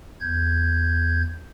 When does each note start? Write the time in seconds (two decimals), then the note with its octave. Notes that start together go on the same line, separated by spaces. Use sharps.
0.21 E2 G6 G#6